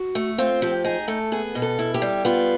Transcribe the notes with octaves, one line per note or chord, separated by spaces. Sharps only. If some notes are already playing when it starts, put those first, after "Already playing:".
Already playing: F#4
A3
C4 F4
F3 G4
D#4 G#4
A3 A4
B3 G#4
B2
A4
E4
G4
G3
B3 F4